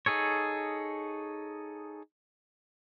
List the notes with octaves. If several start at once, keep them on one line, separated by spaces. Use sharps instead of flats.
D#4 G#4 A4 C#5